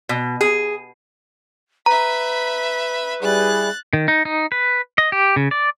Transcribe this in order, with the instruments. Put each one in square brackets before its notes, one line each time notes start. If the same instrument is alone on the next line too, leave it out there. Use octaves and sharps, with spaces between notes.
[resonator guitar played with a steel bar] B2
G#4
[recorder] B4 [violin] E5 B5 [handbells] A#5
[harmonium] G3 E4 G#4 [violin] F#6 A6
[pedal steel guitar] D#3
D#4
D#4
B4
D#5
G4
C#3
D5